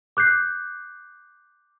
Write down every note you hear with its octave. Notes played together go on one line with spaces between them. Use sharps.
D6 F#6 G6 C7